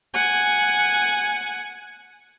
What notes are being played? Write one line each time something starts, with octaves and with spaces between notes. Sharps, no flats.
F#5 G#5